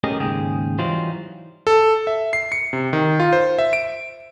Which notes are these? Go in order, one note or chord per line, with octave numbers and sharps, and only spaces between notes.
A3 C#4 G4 G#4 A#4 D#5
D#2 G#2 C#3 G#4 G5
E3 F#3 G3 D#4 F4 C5
A4
E5
C7
C#7
C3
D#3
F4
C5
E5
D7